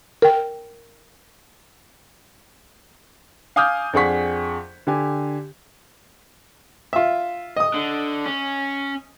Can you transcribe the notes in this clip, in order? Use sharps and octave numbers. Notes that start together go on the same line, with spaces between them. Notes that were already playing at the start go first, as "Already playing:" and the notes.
A#4 G5
F5 G#5 D6 D#6 F6 G6
F2 D4 G#4 F#5 C#6 B6
D3 G4 G#5
F4 E5
D#5 D#6
D3
C#4